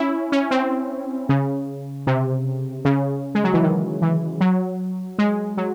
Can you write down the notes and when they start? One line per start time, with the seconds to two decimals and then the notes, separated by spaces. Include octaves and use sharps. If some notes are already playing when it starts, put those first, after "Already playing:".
Already playing: C#4 E4
0.32 C#4
0.51 C4
1.29 C#3
2.07 C3
2.85 C#3
3.35 G#3
3.44 F#3
3.54 E3
3.63 D#3
4.02 E3
4.41 F#3
5.19 G#3
5.57 F#3